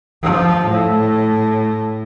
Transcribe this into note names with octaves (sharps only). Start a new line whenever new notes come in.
F3
A2